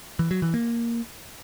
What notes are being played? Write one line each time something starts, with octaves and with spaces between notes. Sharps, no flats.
E3
F#3
E3
A#3